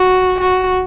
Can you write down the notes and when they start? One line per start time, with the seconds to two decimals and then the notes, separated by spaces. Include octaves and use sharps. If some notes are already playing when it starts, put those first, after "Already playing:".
Already playing: F#4
0.41 F#4